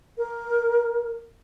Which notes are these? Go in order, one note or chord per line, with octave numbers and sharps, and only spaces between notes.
A#4